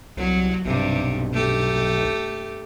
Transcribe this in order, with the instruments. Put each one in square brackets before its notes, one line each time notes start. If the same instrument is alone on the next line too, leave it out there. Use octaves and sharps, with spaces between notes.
[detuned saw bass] C2 [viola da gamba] F#3
[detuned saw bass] B1 [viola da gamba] G2 C3
[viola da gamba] A3 G4